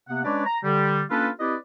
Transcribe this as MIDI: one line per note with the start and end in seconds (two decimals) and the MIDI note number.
0.09 0.23 48
0.09 0.23 58
0.09 0.23 59
0.09 0.23 78
0.24 0.45 56
0.24 0.45 61
0.24 0.45 62
0.24 0.45 71
0.24 0.45 73
0.24 0.45 74
0.46 0.58 82
0.64 1.02 50
0.64 1.02 55
1.11 1.29 58
1.11 1.29 61
1.11 1.29 62
1.11 1.29 65
1.11 1.29 69
1.11 1.29 71
1.40 1.55 60
1.40 1.55 64
1.40 1.55 67
1.40 1.55 71
1.40 1.55 74
1.40 1.55 75